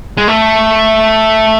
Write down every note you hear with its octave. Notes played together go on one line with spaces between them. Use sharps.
G#3
A3